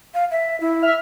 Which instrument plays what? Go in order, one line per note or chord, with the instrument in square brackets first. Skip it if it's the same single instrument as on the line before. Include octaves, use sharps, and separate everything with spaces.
[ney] F5
E5
E4
[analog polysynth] E5 F6